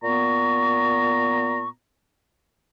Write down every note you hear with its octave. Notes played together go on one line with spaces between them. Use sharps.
A#2 B3 A#5 C#6